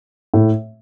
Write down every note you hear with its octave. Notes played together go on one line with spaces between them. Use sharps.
A2